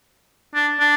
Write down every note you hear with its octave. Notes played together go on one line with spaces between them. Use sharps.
D4
D4